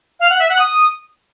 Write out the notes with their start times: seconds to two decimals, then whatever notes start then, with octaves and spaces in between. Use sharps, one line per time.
0.20 F5
0.30 F#5
0.39 E5
0.49 F#5
0.59 D#6